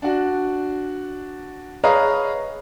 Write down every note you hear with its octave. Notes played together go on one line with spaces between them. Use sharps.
D4 F#4
G#4 B4 C#5 D#5 F5 A#5